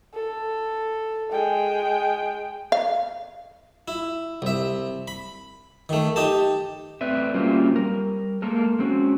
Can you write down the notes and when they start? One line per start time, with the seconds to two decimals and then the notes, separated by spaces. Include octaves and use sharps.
0.14 A4
1.32 G#3 G5
2.72 F5
3.88 E4
4.42 C2 E5
5.08 B5
5.89 D#3 A3
6.16 D#4 G4 A5
7.01 A3 C4 B4 D5 E5
7.34 F#3 G3 A#3 C4 C#4 F4
7.76 G3 A#4
8.42 G#3 A#3 A4 A#4
8.79 G#3 C4 C#4 F#4